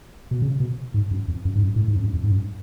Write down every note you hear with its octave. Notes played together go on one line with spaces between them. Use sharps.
B2
C#3
B2
G#2
F#2
F2
F#2
G#2
F#2
A2
G#2
F2
F#2
F2
G#2
F#2